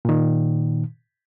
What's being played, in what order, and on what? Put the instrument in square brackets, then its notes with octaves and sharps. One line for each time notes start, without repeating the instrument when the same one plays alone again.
[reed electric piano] A#2 D#3